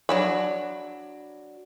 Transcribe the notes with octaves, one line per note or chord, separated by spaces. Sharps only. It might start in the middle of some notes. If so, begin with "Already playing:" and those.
F#3 D4 B5